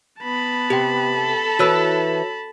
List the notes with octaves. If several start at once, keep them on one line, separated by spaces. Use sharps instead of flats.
B3 A5 B5
C3 G4 G5
A4
E3 E4 F#4 B4 C#5 E6